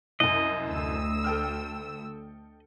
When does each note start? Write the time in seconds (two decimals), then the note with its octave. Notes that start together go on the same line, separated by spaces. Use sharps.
0.20 C2 F#2 D#5
0.66 D2 E6
1.24 A4 G5 F6